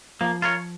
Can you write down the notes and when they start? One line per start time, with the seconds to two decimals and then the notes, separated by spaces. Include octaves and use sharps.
0.21 F3 A#3
0.42 F4 A#4 C#5